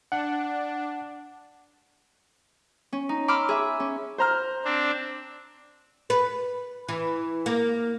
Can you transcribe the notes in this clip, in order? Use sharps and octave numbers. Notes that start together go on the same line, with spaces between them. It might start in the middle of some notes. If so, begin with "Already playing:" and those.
D4 F#5
C#4
D#4
B5 C6 D6 E6 F6
G#4 E5
C#4
C5 A#5 F6
C4 D4
B4
E3
A#3